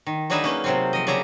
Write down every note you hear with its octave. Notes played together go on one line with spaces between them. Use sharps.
D#3
F#3 D4 D#4 G#4 B4 E5
A#3 C#4 B4
C3 F#3 C4
F3 D#5
C#3 F#3 G#4 D5 E5 A#5